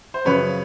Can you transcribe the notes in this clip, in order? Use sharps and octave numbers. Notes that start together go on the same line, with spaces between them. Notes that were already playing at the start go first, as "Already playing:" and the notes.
C5
F#2 C#3 F3 B4 C#5